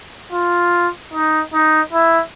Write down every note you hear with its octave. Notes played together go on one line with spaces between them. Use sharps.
F4
D#4
D#4
E4